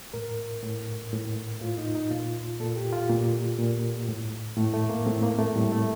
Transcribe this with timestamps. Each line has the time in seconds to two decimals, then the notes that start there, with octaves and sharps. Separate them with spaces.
0.14 A2 A#4
0.63 A2
1.13 A2
1.61 A2 F4
1.78 D#4
1.95 D#4
2.11 A#2 F4
2.60 A#2 A4
2.76 G4
2.93 F4
3.09 A#2 A#3
3.58 A#2
4.08 A2
4.56 A2 A3
4.74 A3
4.90 A#3
5.06 A2 C4
5.23 A#3
5.39 A3
5.55 A2 G3
5.72 A3